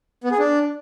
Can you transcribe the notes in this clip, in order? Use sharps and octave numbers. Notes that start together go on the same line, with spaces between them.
B3
G#4
D4